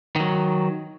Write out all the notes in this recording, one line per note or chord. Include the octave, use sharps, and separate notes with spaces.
D#3 F#3